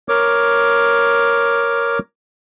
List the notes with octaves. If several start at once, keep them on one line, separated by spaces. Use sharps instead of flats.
A#4 C#5 D6